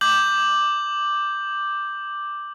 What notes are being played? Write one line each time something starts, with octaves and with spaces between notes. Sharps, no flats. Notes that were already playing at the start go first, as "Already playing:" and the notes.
D6 G6 F#7